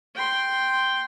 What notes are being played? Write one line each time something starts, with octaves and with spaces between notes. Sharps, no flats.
G5 C6